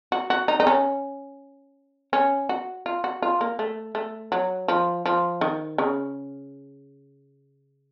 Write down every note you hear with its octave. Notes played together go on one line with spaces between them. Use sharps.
F#4
F#4
D#4
D#4
C#4
C#4
F#4
F4
F#4
F4
A#3
A3
A3
F#3
F3
F3
D#3
C#3